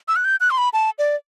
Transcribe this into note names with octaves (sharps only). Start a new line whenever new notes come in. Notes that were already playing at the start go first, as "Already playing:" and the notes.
E6
F#6
G6
F#6
C6
B5
A5
D5